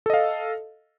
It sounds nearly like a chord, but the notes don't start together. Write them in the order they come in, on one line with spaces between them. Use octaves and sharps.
A4 D#5 F5